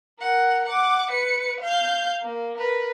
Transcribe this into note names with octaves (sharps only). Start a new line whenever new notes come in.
A#4 F#5
F#5 D6
B4 C#7
F5 G6
A#3
A#4 B4